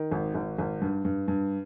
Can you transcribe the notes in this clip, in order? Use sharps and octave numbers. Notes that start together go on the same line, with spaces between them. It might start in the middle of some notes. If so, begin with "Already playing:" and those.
Already playing: D#3
G#1
G#1
G#1
G2
G2
G2